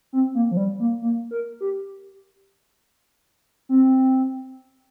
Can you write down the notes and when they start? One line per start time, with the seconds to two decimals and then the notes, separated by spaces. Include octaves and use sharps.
0.13 C4
0.35 A#3
0.51 F3
0.57 G3
0.80 A#3
1.02 A#3
1.31 A#4
1.61 G4
3.69 C4